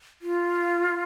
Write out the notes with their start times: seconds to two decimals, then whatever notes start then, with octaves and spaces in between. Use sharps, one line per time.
0.22 F4